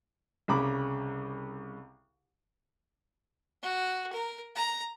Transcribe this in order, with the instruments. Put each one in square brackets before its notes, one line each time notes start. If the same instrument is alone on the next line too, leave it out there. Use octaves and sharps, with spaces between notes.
[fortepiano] C2 C#3 A#5 B5 D6
[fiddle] F#4
A#4
A#5